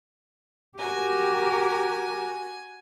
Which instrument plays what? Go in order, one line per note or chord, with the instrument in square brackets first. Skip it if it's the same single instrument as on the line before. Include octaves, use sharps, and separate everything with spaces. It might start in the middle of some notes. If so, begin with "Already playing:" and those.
[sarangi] F#4 [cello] G4 A#4 [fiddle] G#5